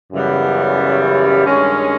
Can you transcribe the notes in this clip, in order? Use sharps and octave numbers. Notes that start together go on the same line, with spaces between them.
F#2 C#3 E3 G3 B3
G2 D#3 G#3 C#4